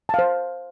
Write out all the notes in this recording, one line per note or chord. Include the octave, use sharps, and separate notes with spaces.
C5 F5 A5